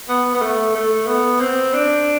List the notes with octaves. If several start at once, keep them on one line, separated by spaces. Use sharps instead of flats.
B3
B3
A3
A3
B3
C4
D4